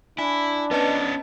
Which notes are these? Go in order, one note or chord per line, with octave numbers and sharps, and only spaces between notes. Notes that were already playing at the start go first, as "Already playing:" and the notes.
D4 E4 G#5
B3 C#4 B4 D#5 A5